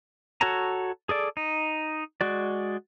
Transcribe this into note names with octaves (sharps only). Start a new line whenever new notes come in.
F#4 A4 C#5 A5 A#5
G#4 A4 D5
D#4
G#3 F#4 D5